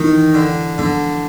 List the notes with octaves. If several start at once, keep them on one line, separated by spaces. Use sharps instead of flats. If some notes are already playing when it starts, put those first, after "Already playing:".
Already playing: D#3 E3 G#3 B3 E4
D3
D3 F3 G#3 B3